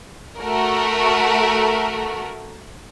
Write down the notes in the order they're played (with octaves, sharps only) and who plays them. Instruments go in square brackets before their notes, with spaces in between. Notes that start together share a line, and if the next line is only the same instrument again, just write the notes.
[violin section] A3 F#4 A#4